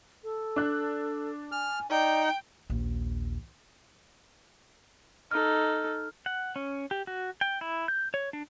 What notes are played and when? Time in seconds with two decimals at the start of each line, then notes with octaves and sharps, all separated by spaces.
0.24 A4
0.56 D4 F#6
1.52 G#5 F6
1.91 D#4 D5 G5
2.70 A#1 D#2
5.31 D#4 A4 F6
6.26 F#5
6.56 C#4
6.91 G4
7.07 F#4
7.41 G5
7.61 E4
7.88 G6
8.14 C#5
8.33 D4